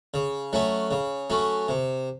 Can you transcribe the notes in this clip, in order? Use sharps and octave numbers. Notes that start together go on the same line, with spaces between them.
C#3
F#3 A3 C#4
C#3
F#3 A3 C#4
C3